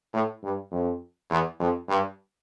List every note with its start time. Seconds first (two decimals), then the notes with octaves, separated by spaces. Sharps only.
0.13 A2
0.43 G2
0.72 F2
1.30 E2
1.60 F2
1.88 G2